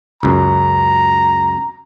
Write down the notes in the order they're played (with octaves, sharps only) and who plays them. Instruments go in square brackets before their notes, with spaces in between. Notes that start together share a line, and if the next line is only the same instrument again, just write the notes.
[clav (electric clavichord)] C#2 F#2 [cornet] A#5